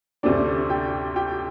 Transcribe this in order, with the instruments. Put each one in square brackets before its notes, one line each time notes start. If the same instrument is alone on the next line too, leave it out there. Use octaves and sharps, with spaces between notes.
[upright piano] D2 C3 A3 C4 D4 D5
G4 G5
G4 G5